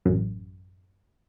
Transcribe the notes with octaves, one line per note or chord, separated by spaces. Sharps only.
A1 F#2